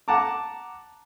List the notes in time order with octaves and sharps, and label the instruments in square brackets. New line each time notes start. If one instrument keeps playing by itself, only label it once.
[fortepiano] F#5 A5 A#5 D6